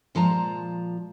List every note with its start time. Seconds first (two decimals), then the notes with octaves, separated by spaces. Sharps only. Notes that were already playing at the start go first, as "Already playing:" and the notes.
0.15 A#2 F3 G#3 A5 A#5